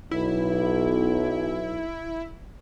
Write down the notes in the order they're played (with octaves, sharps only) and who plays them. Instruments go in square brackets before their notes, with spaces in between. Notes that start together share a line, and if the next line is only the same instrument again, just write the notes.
[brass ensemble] B1 [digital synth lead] E4